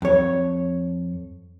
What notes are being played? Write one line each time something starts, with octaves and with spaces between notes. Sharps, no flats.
F2 C#5